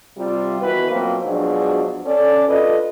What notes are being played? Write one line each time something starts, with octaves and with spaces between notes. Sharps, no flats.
C3 G3 F4
D#3 E3 B3 E4 F#4 B4
B2 F3 F#3 A#3 C4
G#2 B2 F3 F#3 D4 G#4
C#4 A4 D5
D4 F4 A4 B4 D5 D#5